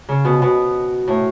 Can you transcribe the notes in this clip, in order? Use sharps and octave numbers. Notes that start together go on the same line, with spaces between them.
C#3
B2
B2
A2